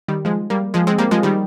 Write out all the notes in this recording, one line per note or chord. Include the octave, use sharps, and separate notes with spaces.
D#3 G3
F3 G#3
G3 A#3
F3 G#3
G#3 C4
G3 A#3
F3 G#3
D#3 G3